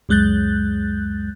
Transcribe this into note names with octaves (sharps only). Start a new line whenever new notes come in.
C#2 F#2 G#3 F#6 G6 A6